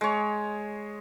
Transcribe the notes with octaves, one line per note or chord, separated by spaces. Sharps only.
G#3 C#5